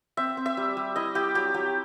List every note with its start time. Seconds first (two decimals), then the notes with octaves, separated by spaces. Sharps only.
0.17 C4 E5
0.37 C4
0.46 E5
0.57 G3
0.77 G3
0.96 E4 D#5
1.15 E4 G4
1.35 F#3 G4
1.54 F#3 G4